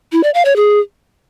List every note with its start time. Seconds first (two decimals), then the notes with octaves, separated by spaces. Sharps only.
0.12 E4
0.23 D5
0.34 F5
0.45 C#5
0.56 G#4